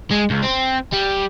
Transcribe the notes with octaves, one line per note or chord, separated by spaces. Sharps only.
G#3
C#2
C4
G3